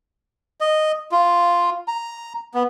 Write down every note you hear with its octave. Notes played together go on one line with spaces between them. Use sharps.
D#5
F4
A#5
B3